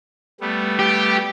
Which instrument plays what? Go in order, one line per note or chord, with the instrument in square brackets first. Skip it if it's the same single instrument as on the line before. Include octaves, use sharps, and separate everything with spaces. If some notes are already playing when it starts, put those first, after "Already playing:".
[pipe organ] G3 A3 B3
[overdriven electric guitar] G4